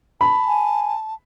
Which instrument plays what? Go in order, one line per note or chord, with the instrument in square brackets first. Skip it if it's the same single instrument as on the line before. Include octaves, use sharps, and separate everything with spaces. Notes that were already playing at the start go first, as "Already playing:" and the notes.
[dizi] A5 [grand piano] B5
[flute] G#5